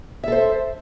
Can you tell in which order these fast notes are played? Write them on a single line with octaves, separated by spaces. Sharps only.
E5 A4 C5